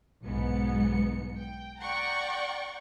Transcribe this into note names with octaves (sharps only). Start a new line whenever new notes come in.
B1 G#2 B3 C#7
G5
D5 F#5 G5 A#5 C#6